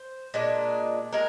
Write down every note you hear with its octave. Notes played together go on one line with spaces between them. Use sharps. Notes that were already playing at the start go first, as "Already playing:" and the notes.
Already playing: C5
A#2 G#3 D4
G#3 A#4